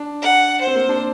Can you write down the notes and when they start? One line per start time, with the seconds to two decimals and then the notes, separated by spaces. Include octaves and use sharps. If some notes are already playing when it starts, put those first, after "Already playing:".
Already playing: D4
0.22 F#5
0.62 C5
0.67 C4
0.75 A#3
0.89 D4